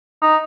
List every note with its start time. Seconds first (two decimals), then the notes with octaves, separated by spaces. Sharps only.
0.22 D#4